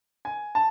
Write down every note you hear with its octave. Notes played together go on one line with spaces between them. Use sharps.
G#5
A5